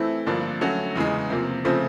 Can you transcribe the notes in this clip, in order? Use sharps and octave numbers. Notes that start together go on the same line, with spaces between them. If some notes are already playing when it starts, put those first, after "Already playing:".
Already playing: E3 A3 C4 E4
G2 D3 F3 A#3 D4
F#3 A3 C#4 F#4
E2 C#3 E3 G#3
C3 F3 A#3
C#3 F3 A3 C4